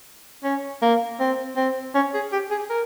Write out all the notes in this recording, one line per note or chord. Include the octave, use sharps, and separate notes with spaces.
C#4
A#3
C4
C4
C#4
G#4
G4
G#4
A#4